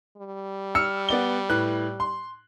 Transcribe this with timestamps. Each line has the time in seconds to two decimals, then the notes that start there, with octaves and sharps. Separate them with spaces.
0.17 G3
0.75 E6 F6 C#7
1.09 B3 D5 G7
1.49 A2 B4 F#6
2.00 C6